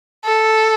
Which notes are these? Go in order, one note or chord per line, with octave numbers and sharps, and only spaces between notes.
A4